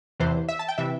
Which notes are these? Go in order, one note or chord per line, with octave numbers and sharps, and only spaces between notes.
E2 C3 E3 C5
E5
A5
G5
C3 E3 E5